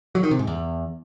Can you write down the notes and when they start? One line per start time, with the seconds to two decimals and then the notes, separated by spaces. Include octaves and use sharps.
0.15 F#3
0.23 D#3
0.31 C3
0.39 G#2
0.47 E2